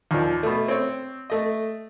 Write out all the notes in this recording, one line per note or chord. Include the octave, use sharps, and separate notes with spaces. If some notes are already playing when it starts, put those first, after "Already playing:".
D#2 A#2 F3
B2 A3
C4 C#5
A3 D#5